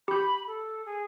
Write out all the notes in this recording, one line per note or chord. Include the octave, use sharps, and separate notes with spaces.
G4 B5 G6
A4
G#4